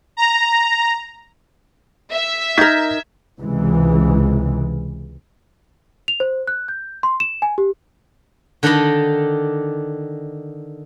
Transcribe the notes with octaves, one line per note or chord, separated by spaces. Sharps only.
A#5
E5
D#4 A#4 G6 G#6 B6
C#2 C3 E3 G#3
F7
C5
F#6
G6
C6
E7
G#5
G4
D3 D#3 D4 A4 D#5 B5